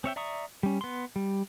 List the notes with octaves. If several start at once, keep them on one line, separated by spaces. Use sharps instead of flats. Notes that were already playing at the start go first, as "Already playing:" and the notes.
C4 C#5 E5 G5
D5 E5 A#5 C#6 D#6
G3 C#4
B3 C6
G3